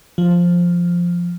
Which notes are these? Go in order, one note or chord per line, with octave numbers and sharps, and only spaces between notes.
F3